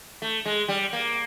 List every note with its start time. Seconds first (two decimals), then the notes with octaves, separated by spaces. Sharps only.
0.22 A3
0.45 G#3
0.68 G3
0.93 A#3